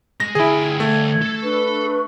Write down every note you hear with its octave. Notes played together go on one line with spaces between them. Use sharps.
G#3 A#6
D2 E4 G#4 G5
A3 G#6
A4
D4 B4 C#6